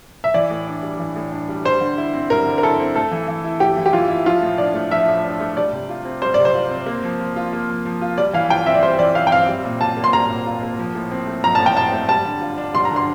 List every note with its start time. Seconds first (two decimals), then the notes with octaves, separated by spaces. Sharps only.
0.24 E5
0.34 E3 D5
0.51 A2
0.67 D4
0.83 G3
0.99 E3
1.16 A2
1.32 D4
1.49 G3
1.65 G3 C5
1.81 D3
1.98 E4
2.13 C4
2.30 G3 A#4
2.46 D3
2.58 A#4
2.63 E4 A4
2.79 C4
2.96 A3 A4
3.11 E3
3.28 E3
3.44 E4
3.60 A3 G4
3.77 E3
3.86 G4
3.93 E3 F4
4.09 E4
4.25 F3 F4
4.42 A2
4.58 D4 D5
4.74 A3
4.91 F3 E5
5.08 A2
5.24 D4
5.40 A3
5.57 G3 D5
5.73 C3
5.89 F4
6.05 C4
6.22 G3 C5
6.34 C3 D5
6.45 C5
6.54 F4
6.70 C4
6.86 A#3
7.04 F3
7.20 F3
7.36 F4
7.53 A#3
7.69 F3
7.85 F3
8.01 F4
8.18 G3 D5
8.33 E3 F5
8.50 F4 G5
8.66 C4 E5
8.74 D5
8.83 G3 C5
8.99 E3 D5
9.15 F4 F5
9.27 G5
9.32 C4 F5
9.48 G3
9.64 A#2
9.81 F4 A5
9.97 A#3
10.04 C6
10.13 G3 A#5
10.30 A#2
10.46 F4
10.63 A#3
10.79 F3
10.95 A2
11.11 C4
11.27 A3
11.43 F3 A#5
11.55 A2 A5
11.66 G5
11.76 C4 A5
11.93 A3
12.09 G3 A5
12.25 D3
12.41 F4
12.58 D4
12.74 G3 C6
12.85 A#5
12.91 D3
12.96 C6